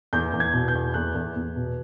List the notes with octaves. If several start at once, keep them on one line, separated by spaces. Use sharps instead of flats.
E2 G6
E2
G#6
B2
G6
E2
E2 F#6
E2
E2
B2